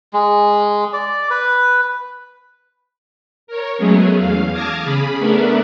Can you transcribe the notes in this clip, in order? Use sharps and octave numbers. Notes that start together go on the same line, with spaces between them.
G#3
D5
B4
A#4 C#5
F#3 G#3 A3 B3 C#4 G#4
E2 F5
A5 D6 D#6 F6 G#6 A#6
C#3 G#4 B5
A3 B3 D4 A#4 B4 E5